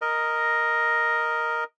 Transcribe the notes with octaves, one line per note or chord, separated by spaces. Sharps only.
A#4 D#5